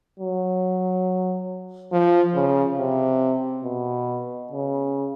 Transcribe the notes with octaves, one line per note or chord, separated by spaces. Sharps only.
F#3
F3
C#3
C3
B2
C#3